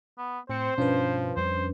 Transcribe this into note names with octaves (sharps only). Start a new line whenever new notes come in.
B3
A2 C4 C5 C#7
G2 B2 F3 C#4 D4 B4
F2 G3 C5